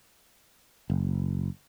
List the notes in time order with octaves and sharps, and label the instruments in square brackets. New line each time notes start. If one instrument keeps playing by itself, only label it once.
[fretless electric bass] F#1